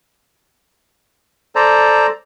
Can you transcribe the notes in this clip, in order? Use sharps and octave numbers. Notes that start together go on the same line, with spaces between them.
A4 C5 D5 A#5